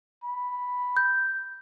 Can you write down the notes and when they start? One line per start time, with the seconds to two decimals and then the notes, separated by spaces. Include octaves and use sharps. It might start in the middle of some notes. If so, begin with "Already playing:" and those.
0.23 B5
0.97 G6